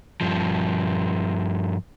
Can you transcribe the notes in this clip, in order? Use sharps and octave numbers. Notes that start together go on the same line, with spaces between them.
G2 F3